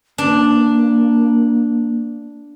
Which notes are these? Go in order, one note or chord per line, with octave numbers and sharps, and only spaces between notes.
A#3 D4